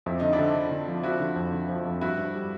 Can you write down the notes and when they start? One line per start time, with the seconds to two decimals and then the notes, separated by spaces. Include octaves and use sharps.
0.06 F2 E4
0.20 D3 D#4
0.33 D4 E4
0.39 D3
0.56 D3
0.71 D3
0.88 F3
1.03 F3 E4 F#4
1.20 D3
1.36 F2
1.53 D3
1.69 F3
1.85 F2
2.01 G2 E4 F#4
2.18 G2
2.35 G3